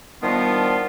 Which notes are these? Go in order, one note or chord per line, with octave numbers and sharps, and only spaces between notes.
D#3 F3 G3 B3 D4 F4